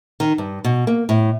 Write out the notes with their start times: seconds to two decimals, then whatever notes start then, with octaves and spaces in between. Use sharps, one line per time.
0.20 D#3
0.38 G2
0.64 B2
0.87 A#3
1.09 A2